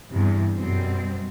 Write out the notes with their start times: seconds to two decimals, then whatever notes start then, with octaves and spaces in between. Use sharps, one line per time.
0.12 E2 G2 C3
0.55 F#2 B2 G3 C4